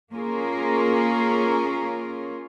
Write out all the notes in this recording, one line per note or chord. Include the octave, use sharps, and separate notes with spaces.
A#3 C#4 F4 G#4 A#4